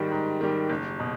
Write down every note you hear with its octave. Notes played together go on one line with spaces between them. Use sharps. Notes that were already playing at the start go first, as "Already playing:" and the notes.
Already playing: G#2 D#3 G3
G#2
D#3 G3
F#1
B2